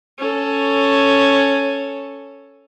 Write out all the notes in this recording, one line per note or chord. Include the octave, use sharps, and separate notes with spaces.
C#4 A4